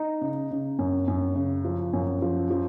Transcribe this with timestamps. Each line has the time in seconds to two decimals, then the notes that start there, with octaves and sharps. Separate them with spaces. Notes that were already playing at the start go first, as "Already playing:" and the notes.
Already playing: D#4
0.21 C#3
0.51 C#3
0.79 F#2
1.08 F#2
1.35 C#3
1.65 F3
1.93 F#2
2.22 F3
2.50 F3